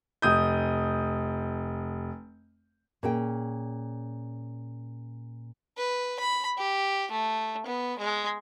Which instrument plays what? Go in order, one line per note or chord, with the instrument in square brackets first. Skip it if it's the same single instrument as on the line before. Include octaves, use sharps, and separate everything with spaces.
[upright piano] F1 D#6 G6
[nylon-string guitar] A#2 C#4 G#4 G5
[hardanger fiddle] B4
B5
G4
A3
B3
G#3